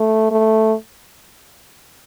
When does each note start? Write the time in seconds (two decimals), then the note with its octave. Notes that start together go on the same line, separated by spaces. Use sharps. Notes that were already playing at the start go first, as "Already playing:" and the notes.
Already playing: A3
0.31 A3